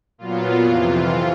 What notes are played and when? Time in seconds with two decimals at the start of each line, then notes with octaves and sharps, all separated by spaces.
0.18 A#2 F#3 B3 F4
0.62 F2 C3 E3